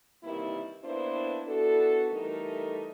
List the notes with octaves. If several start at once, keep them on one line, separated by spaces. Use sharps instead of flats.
C3 D#3 E3 G3 A#3 E4
A#3 B3 D4 E4 B4 C5
B3 D4 E4 F#4 A4
E3 G3 A3 D#4 A4 A#4